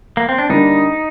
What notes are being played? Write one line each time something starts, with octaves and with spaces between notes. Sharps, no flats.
A#3
C4
D4
D3 G3 A#3 D4 D#4